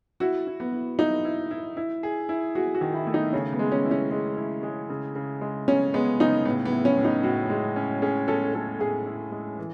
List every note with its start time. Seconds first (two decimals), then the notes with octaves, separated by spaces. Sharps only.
0.20 E4 F#4
0.47 E4
0.60 B3
0.73 E4
0.98 D#4 E4
1.25 E4
1.51 E4
1.77 E4
2.03 G#4
2.29 E4
2.55 F#4 G#4
2.75 F#4
2.81 D#3
2.94 E4
3.07 A3
3.14 D#4
3.33 C#3 C#4
3.53 B3
3.59 G#3
3.72 C#4
3.85 E4
3.91 C#4
4.11 G#3
4.38 E4
4.63 G#3
4.89 C#3
5.15 C#3
5.41 G#3
5.68 C#3 C#4
5.94 G#3 B3
6.20 C#3 D#4
6.45 A2 B3
6.65 B3
6.72 E4
6.85 C#4
6.97 A2
7.05 D#4
7.23 A2 F#4
7.50 G#3
7.76 C#4
8.02 C#4 G#4
8.28 C#4 A4
8.54 C#4 A4
8.79 A2 G#4
9.06 E4
9.32 G#3
9.58 E3